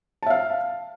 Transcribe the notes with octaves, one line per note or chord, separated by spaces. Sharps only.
E5 F5 A5